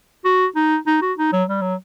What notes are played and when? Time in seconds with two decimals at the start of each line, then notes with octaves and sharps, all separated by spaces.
0.25 F#4
0.56 D#4
0.87 D#4
1.02 F#4
1.18 D#4
1.33 F#3
1.49 G3
1.62 F#3